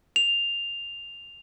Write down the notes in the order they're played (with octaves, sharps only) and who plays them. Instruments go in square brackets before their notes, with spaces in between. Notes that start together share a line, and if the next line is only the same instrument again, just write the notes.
[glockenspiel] F7